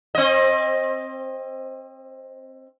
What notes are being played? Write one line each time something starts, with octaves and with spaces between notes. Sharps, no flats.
C4 D#5